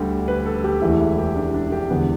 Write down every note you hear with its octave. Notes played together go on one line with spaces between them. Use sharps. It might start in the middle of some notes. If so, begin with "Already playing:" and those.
Already playing: D2 D3 G3
B4
A4
G4
E1 E2 E3 A3 E4
E4
G4
D4
D4
G4
E1 E2 D3 B3